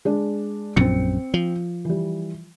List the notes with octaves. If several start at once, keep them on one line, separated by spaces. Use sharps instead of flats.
G#3 D4
A#1 F#2 A#2 C4 C#7
F3
E3 G3